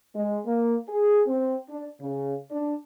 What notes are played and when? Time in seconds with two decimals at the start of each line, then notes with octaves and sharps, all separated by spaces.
0.16 G#3
0.46 A#3
0.89 G#4
1.27 C4
1.69 D4
2.01 C#3
2.51 D4